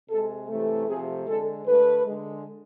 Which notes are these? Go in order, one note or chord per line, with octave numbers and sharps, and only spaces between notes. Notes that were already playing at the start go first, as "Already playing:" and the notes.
C3 G#3 A4
C3 E3 A3
C3 F3 A3 G#4
D3 G#3 A4
D3 A3 B4
D3 G#3